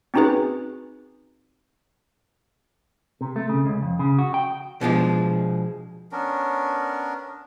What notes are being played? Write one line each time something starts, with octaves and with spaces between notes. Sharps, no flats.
C4 C#4 D#4 F#4 G#4 B4
C3
A3
C#3
C#2
F2
C#3
F#4
G5
B2 F3 G#3 D4
B3 C#4 D4 A#4